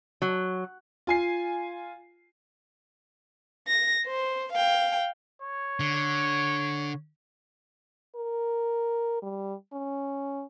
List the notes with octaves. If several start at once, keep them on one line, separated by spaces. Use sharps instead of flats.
F#3
F4 G#5 C7
A#6
C5
F5 G5
C#5
D3
A#4
G3
C#4